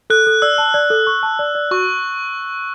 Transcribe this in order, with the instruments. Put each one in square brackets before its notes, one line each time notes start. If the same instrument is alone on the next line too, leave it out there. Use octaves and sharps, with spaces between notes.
[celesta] A4 [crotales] F#6
[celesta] A4
[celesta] D5 [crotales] E6
[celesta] A5
D5
A4
C#6
A5
D5
D5
[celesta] F#4 [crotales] C#6